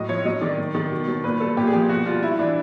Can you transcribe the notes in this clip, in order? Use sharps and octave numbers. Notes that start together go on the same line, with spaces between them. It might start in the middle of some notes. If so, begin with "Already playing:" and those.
Already playing: A2 F#3 D#5
F3 C#5
F#3 D#5
D#3 D5
F#3
D#3
B2
F#3
A#2 B4
G3 A4
A#2 G4
G#4
F3 G4
B2 F#4
G3 F4
G3 E4
E3 D4